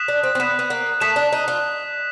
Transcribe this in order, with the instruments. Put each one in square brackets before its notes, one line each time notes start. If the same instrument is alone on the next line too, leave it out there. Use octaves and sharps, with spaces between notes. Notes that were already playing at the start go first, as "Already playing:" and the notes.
Already playing: [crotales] D#6 F#6 B6 E7
[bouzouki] D4
C4
C4
[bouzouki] B3 [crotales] D#6 F#6 B6 E7
[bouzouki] B3
A#3
[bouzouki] A3 [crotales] D#6 F#6 B6 E7
[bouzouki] D4
D#4
F4